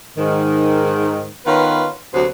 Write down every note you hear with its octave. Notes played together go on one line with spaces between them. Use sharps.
G#2 D#3
D#3 B3 C#4 F4 B4
D2 C3 F#3 B3 B4 C5